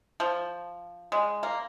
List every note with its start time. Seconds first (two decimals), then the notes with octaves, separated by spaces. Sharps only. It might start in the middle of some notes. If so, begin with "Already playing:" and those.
0.20 F3
1.12 G#3
1.43 A#3